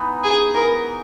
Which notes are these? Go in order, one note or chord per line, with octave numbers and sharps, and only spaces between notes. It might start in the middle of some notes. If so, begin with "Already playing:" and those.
Already playing: E3 B3 D#4
G#4
E3 B3 D#4 A#4